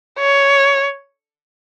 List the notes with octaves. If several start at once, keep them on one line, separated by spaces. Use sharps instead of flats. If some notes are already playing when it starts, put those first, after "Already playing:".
C#5